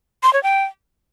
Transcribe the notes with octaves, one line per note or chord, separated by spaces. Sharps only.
C6
C#5
G5